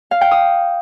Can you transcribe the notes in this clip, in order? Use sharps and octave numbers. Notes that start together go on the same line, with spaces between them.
F5
G5
D#6